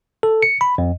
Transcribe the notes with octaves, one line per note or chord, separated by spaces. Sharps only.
A4
C#7
B5
F2